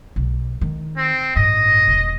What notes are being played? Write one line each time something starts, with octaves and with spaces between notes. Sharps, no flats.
B1
D#3
C4
A1 G2 D#5
E1 A#1